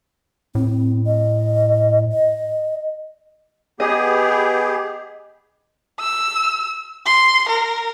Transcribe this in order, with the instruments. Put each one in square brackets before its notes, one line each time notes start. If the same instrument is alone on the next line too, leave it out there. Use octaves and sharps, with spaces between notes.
[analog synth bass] A2 [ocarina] C4
[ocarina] D#5
D#5
[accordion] B3 G4 G#4 [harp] D#5
[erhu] E6
C6
A#4